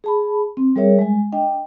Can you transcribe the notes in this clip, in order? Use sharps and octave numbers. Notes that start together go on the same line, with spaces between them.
G#4 A5 B5
C4
G3 G#4 A#4 C#5 E5
G#3 G#5
D4 D#5 G5